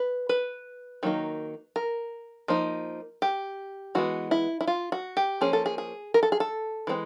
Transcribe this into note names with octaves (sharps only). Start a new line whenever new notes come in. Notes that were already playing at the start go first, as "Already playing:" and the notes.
Already playing: B4
B4
D#3 F#3 A#3 D#4
A#4
F3 A#3 D#4
G4
E3 G#3 B3 F#4
E4
E4
F4
F#4
G4
F3 A#3 C#4 G#4
A4
G#4
G#4
A#4
A4
G#4
A4
E3 G#3 C4